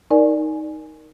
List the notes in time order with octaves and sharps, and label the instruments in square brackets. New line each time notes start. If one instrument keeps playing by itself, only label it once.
[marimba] D#4 A#4 D5 G#5